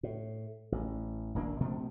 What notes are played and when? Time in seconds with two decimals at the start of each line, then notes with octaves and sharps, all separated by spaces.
0.03 A2
0.72 A1
1.35 D#1 A#1 A#3 D4
1.60 B2 F3 A3 C4